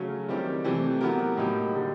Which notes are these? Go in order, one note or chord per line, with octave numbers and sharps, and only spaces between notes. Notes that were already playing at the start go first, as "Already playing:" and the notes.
Already playing: C#3 F#3 A3 C#4
D#3 G3 C4 E4 G4
C3 E3 A3 C4
F#3 B3 E4 G4 A#4
A2 F#3 A#3 D#4 G4
D3 G3